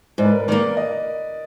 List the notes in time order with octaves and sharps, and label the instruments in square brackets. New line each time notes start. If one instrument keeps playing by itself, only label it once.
[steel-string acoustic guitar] G#2 [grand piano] D5
[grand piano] B4
A#4
B4
[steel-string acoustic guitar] D#3 A#3 [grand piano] D5
[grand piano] D#5